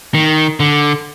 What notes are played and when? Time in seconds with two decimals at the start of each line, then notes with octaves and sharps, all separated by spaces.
0.14 D#3
0.60 D3